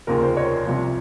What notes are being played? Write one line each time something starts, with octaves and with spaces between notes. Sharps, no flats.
F1 D#2 C#3 F3 A#4
C5
A#4 C#5
C2 C3 F3